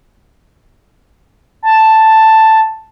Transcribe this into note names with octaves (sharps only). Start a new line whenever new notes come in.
A5